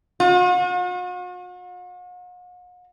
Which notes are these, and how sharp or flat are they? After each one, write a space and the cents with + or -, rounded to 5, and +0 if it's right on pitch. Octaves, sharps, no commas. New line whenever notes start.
F#4 -45